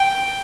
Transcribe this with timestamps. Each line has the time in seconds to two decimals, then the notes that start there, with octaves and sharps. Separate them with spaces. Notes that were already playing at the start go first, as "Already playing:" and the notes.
Already playing: G5